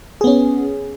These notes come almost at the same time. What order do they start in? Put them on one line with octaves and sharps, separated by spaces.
G#4 B3 C#4